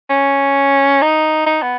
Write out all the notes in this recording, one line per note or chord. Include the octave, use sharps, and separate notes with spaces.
C#4
D#4
D#4
B3